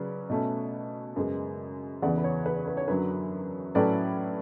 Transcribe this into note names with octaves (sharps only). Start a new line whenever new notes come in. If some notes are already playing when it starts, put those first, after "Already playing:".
Already playing: C#3 F#3 C#4 B4 D5
B2 A3 C#4
F#2 C#3 G#3 B3
E2 C#3 E3 B3 D5 F#5
B4
C#5
B4
B4
C#5
F#2 D3 F#3 B4
A2 F#3 A3 C#4 B4 D5